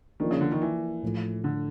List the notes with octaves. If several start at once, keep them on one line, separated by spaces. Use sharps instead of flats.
D#3 F3 A#3 D4
C#3
D3
D#3
E3
A2 F3 A3
D3